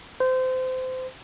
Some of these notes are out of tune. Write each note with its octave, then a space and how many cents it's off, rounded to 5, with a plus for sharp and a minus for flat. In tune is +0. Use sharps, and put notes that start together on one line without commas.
C5 -25